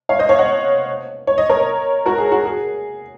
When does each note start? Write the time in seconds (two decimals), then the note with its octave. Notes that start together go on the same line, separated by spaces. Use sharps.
0.09 C#5 F5
0.19 C5 D#5
0.29 C#5 F5
0.39 D#5 F#5
1.27 C#5
1.38 D#5
1.49 A#4 C#5
2.06 F#4 A#4
2.18 G#4
2.32 F#4
2.45 G#4